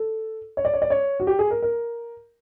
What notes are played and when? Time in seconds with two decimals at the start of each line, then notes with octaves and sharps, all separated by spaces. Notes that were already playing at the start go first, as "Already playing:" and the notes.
Already playing: A4
0.57 C#5
0.65 D5
0.74 C#5
0.82 D5
0.90 C#5
1.20 F#4
1.27 G4
1.39 G#4
1.51 A#4
1.62 A#4